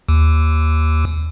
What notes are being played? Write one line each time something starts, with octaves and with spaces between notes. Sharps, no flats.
D#2